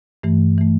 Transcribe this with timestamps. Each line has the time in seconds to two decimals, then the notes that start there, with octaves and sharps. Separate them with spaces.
0.23 G2 E3 A3
0.58 E3 A3